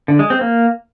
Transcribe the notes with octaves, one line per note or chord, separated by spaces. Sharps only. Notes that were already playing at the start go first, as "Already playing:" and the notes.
D3
G#3
C4
A#3